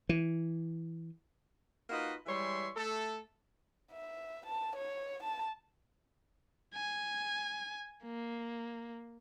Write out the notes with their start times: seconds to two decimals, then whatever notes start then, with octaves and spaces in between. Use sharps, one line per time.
0.09 E3
1.89 A#3 D#4 F4 F#4 B4 D#5
2.26 E3 G3 G#3 C#5 E5 C6
2.75 A3 A4
3.92 E5
4.46 A5
4.76 C#5
5.23 A5
6.75 G#5
8.05 A#3